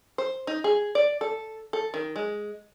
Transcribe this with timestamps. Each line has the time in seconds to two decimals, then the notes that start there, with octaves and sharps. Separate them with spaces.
0.18 C5
0.47 D#4
0.64 G#4
0.95 D5
1.21 A4
1.73 A4
1.94 D#3
2.16 G#3